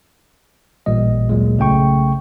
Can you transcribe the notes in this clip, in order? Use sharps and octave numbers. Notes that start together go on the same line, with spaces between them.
A1 A#2 G3 D#5
D2 A#2 F#3 G#3
B1 C#3 A3 G5 C#6